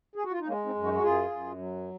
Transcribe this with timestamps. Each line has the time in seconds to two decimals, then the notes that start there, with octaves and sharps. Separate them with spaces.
0.16 G#4
0.24 F#4
0.31 F4
0.40 D#4
0.47 G#3 A#3 C#4
0.65 C4 D#4
0.75 F#2
0.84 D#4 F#4
0.94 F#4
1.02 F#2 F4 G#4
1.30 F#2
1.58 F#3